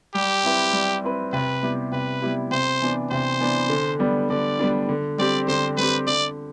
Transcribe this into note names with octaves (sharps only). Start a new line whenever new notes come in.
G3 G4
C4 E4 B4
G3
C4 E4 B4
C3 B4
G3 B3 E4 G4
C3 B4
G3 B3 E4 G4
C3 C5
E3 B3 D4
C3 C5
E3 B3 D4
D3
G3 B3 D4
D3 D5
G3 B3 D4
D3
G3 C4 G4 D5
D3 C5
G3 C4 G4 B4
D3 D5